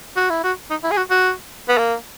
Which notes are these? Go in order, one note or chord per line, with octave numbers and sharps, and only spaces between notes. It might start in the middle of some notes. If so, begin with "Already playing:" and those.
F#4
E4
F#4
D#4
E4
G#4
F#4
F#4
B3
A#3